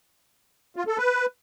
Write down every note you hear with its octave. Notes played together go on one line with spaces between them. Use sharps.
F4
A4
B4